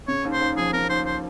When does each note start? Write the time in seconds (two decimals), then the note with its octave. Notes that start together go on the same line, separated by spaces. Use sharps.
0.08 C#3 C#5
0.25 D#2
0.33 C5
0.41 D#2
0.57 F3 G#4
0.73 C#3 A#4
0.89 D#2 C5
1.06 C5